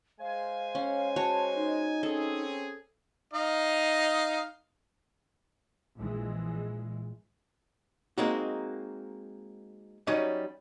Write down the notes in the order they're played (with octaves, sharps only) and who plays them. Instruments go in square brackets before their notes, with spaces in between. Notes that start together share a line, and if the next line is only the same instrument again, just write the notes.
[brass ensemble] G#3 C5 G#5 [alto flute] F5
[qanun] C#4
[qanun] F#4 C#5 [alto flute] A5
[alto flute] D#4
[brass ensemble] C4 C#4 G#4 [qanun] A4
[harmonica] D#4 D#5 F5
[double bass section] A#1 A#2 E3 G#3
[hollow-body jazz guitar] G#3 A#3 C4 D#4 F#4
F#3 G3 C#4 D#4 D#5